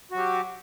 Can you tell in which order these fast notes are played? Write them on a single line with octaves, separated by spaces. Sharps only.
F#4 F#3 G4